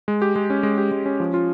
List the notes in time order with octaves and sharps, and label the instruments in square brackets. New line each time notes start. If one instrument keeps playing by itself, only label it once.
[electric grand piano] G#3
G4
G#3
C#4
G#3
G4
G#3
C#4
F3
F4